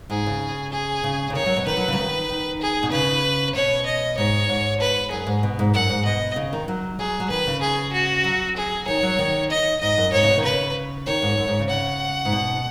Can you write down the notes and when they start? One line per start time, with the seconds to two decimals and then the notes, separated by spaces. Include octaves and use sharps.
0.10 G#2 G#4
0.26 C#3
0.72 G#4
1.04 C#3
1.30 C#3
1.35 D#3 C#5
1.46 F#3
1.56 B2
1.66 D#3 B4
1.77 F#3
1.88 C#3 F#3
1.98 D#3
2.29 D#3
2.61 G#4
2.83 B2
2.92 C#3 B4
3.55 B2 C#5
3.86 D#5
4.18 G#2 C#5
4.49 G#2
4.80 B4
5.11 F#2 G#4
5.27 G#2
5.43 B2
5.59 G#2
5.74 F#2 F#5
5.89 G#2
6.05 B2 D#5
6.36 C#3
6.53 D#3
6.68 F#3
6.99 F#3 G#4
7.20 F#3
7.30 D#3 B4
7.47 C#3
7.61 G#4
7.93 F#4
8.24 F#3
8.57 G#4
8.87 D#3 C#5
9.03 F#3
9.19 D#3
9.50 D#5
9.81 G#2 D#5
9.97 F#2
10.12 G#2 C#5
10.23 C#3
10.28 B2
10.38 D#3
10.44 C#3 B4
11.06 D#3 C#5
11.22 G#2
11.37 F#2
11.48 G#2
11.59 C#3
11.70 C#3 F#5
12.25 G#2
12.32 B2